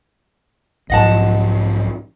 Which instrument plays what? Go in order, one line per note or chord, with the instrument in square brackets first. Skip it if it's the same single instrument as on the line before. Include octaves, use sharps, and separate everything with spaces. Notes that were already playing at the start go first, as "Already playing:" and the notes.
[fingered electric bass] B1 G#2 F3 [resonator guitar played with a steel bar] D#5 F#5 A5